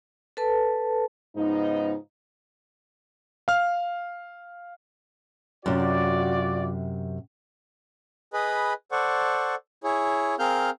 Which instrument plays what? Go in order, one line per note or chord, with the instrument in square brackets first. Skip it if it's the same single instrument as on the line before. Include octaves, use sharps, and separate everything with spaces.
[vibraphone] A4 B4 A5
[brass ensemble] G#2 C#3 F3 B3 D#4
[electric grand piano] F5 F6
[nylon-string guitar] F#2 C3 [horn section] F4 F#4 D5
[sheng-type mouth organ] G#4 B4 D#5 B5
A4 C5 D5 F#5 C#6
E4 G#4 C#5
C4 G#4 A#4 F5 F6 G6